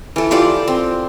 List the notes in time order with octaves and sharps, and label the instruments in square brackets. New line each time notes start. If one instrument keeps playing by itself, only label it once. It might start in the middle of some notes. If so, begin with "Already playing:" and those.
[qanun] E3 A4
F4 G4 A4 D5
C4